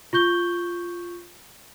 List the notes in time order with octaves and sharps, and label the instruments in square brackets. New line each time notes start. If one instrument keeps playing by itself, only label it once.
[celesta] F4 C#6 G6 G7